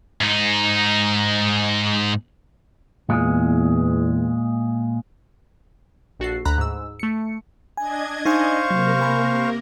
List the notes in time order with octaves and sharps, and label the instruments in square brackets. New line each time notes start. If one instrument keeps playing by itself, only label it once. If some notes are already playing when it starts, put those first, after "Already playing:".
[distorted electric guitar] G#2 D#4
[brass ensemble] E2 [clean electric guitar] A#2 G#3
[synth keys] A#1 F#4 A4 C7
D2 A#5 B5 F#6
G#2 E6
A3 C#7
[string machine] D4 D#5 G#6 [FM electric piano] G#5
[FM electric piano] D#4 G#5 [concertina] C5 F5 C#6
[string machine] C3 A#3 A#4 [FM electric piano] F#3
[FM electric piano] G#5 B5